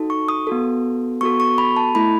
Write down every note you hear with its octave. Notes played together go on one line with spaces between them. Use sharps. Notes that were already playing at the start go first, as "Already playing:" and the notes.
Already playing: D#4 F#4 A4
C#6
D#6
B3 F#4 A4
B3 F#4 A4 C#6
C#6
B5
A5
A3 E4 A4 B5